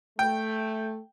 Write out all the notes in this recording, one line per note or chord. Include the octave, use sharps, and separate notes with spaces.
A3 G5